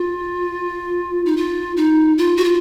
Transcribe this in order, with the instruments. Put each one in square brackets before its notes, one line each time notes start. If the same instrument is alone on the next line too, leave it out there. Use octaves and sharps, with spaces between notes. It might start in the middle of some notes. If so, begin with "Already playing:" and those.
Already playing: [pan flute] F4
D#4
F4
D#4
F4
F#4
F4